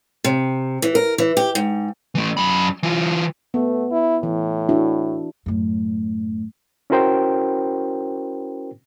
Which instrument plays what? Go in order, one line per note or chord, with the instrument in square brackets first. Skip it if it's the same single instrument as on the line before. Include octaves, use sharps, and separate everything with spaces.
[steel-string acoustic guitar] C3
E3
A#4
E3
G4
G#2
[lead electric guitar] E3 A3
F#2 B5
E3 F4
[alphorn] A3 [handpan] B3
[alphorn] E4
[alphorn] A2 [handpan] E3
[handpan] D4 E4 F#4
[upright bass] F#2 A2
[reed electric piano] C#4 E4 F#4 A#4 C5 G5